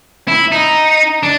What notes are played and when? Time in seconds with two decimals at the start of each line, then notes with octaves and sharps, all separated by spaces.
0.28 E4
0.52 D#4
1.23 D4